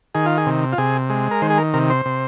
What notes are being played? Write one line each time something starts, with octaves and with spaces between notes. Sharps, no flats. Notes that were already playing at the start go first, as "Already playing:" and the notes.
D#3 G#4
F4
G#4
C3
F4
C3 G#4
G#3
A#4
D#3 C5
G#4
A#4
C3 A#4
C5
C3